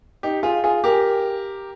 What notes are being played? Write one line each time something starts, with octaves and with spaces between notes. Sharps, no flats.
D#4 G4
F4 G#4
F4 G#4
G4 A#4